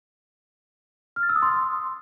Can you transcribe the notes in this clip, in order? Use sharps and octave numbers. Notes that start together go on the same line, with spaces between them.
F6
A6
E6
D#6
C6